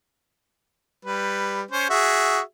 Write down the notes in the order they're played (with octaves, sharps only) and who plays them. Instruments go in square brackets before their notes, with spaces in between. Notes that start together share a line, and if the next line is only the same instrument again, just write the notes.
[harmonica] G3 B4
C#4 C5
F#4 G#4 E5